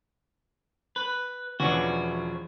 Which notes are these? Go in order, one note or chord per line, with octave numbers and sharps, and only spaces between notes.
B4
E1 E3 F3 C#4 D4 F#4